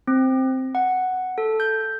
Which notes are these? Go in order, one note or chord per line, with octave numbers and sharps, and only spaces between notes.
C4
F#5
A4
G6